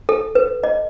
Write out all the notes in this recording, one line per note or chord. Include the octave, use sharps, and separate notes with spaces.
A4
B4
D#5